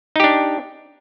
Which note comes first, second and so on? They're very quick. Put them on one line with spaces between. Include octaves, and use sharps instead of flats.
D#4 G4 D4